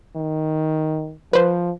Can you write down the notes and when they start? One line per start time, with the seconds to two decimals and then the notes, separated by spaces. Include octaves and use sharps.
0.16 D#3
1.33 F3 B4 C5